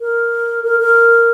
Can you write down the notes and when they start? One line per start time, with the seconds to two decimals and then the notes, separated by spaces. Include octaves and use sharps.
0.01 A#4
0.64 A#4
0.80 A#4